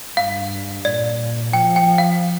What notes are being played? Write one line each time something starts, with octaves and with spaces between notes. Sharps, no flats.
G2 F5
A#2 D5
F3 G5
G5
F5